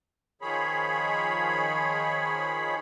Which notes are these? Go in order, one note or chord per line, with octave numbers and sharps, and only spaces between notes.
D#3 F3 G#4 C#5 B5